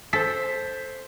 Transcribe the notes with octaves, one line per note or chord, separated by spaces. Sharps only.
A4 C5 B6